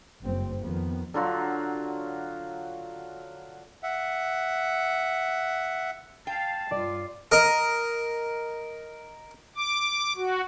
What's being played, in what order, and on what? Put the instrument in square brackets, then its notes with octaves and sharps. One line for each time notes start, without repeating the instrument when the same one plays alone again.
[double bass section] F#1 G2 C4
F2 D#3 F3 B3
[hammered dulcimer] D3 F#3 F4 F#4
[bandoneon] E5 F#5
[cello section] F5 [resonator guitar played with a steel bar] G5 [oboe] A5
[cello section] G2 F4 [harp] D5
[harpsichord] A#4 D#5
[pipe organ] D6
F#4